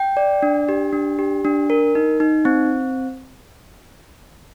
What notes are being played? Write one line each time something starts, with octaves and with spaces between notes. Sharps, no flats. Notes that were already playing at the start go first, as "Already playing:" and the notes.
Already playing: G5
D5
D4
G4
D4
G4
D4
A#4
D#4
D#4
C4